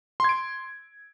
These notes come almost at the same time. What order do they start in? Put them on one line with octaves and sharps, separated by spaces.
C6 G#6 D7